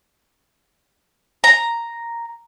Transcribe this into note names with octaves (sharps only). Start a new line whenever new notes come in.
A#5